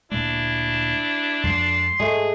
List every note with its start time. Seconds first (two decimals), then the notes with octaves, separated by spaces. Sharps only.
0.12 D2 A#2 G#3 D4 E4
1.43 F2 F3 G#3 C6
1.99 G#2 G#3 A3 G#4